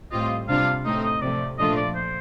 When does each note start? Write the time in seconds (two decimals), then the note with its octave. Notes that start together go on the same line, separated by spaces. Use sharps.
0.11 A2 G3 C4 F4 D#5
0.48 C3 G3 D4 F4 F5
0.85 A2 A3 C4 D#4 D#5
1.04 D#5
1.21 C3 F3 A3 D5
1.58 A#2 F3 A3 D4 F4 D#5
1.76 D5
1.95 C5